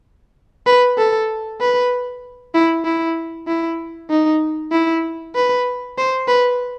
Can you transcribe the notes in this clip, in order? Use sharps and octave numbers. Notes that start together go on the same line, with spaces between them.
B4
A4
B4
E4
E4
E4
D#4
E4
B4
C5
B4